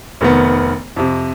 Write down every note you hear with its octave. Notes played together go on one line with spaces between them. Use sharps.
F1 D#3 B3
F2 C3